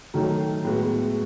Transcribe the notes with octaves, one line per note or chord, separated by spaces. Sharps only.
D#3 F#3 A3
A2 G#3 B3 F#4